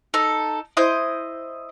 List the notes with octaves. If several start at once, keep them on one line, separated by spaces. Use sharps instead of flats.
D#4 A4
E4 C5 D#5 G6